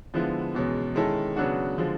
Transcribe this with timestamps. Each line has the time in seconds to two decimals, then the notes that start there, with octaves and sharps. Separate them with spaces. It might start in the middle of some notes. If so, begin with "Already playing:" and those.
0.13 D3 F3 G#3 B3 E4
0.55 E2 B2 G#3 C#4
0.95 D#3 G#3 C#4 E4 A4
1.36 C#3 F#3 B3 D4 F#4
1.78 D3 F3 G#3